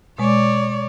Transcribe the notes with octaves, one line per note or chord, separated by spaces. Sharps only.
B2 G#3 C#5 D5